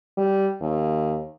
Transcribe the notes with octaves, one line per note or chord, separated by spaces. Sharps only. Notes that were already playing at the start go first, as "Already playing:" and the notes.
G3
D#2